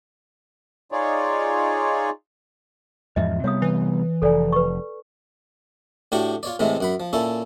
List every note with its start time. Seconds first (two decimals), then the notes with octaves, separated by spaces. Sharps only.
0.92 D#4 F4 G#4 C#5 D5
3.16 E2 G#2 F3 D#5 E5
3.44 C3 G3 B3 C#5 F5 D#6
3.62 E3
4.22 F1 A4 D5 G#5
4.52 B4 C#6
6.12 A2 D4 F#4 G4 C#6 D6
6.43 F4 C#5 D5
6.59 A2 C3 E3 G#3 A3 C4
6.81 F#2 F#5 B5
7.00 F3
7.13 A#2 C#4 E4 A4